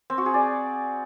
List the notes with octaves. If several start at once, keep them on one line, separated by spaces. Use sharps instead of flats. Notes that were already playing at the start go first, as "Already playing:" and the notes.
C4
F#4
G#4
D5